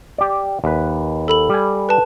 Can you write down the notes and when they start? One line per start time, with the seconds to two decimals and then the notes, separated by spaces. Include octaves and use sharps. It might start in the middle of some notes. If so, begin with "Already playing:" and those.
0.18 G4 D5
0.64 D#2 B4
1.28 A4 B5 F#7
1.49 G3 G#5
1.89 B4 A5